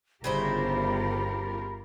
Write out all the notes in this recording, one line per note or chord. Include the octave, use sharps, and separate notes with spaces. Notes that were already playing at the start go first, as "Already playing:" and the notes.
G1 C#3 E4 F4 G4 A#4 C5 B5